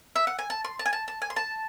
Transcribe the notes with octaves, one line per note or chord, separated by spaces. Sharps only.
E5
F#5
G#5
A5
C6
A5
G#5
A5
A5
G#5
C6
A5